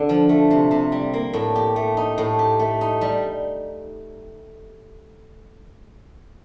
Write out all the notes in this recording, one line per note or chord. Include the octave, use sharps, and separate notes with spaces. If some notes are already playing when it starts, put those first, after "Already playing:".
Already playing: D3
F3
A3
C3
C3
G3
A#3
A2
G4
A3
D#4
A2
G4
A3
D#4
G3